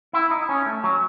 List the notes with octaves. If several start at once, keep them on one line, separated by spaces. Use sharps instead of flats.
E4
D#4
C#4
A3
F#3